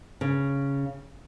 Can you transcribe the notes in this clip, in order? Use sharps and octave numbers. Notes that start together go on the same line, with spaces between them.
C#3